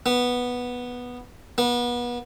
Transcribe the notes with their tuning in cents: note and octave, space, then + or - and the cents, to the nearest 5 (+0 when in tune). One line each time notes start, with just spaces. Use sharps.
B3 -5
B3 -30